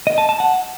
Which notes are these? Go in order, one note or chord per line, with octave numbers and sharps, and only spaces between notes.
D#5
A5
A5
F#5